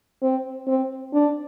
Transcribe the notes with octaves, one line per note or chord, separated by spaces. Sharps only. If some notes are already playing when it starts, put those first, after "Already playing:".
C4
C4
D4